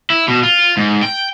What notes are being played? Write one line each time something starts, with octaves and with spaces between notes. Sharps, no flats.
E4
B2
F4
G#2
G5